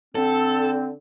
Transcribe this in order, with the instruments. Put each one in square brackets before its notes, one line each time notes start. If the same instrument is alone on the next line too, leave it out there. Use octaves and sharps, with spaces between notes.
[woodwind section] D3 C4 [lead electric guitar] A4